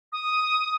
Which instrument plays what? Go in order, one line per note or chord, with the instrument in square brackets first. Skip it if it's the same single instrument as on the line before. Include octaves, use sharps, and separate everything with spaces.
[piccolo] D#6